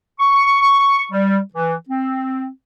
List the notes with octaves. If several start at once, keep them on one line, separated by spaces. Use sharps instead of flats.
C#6
G3
E3
C4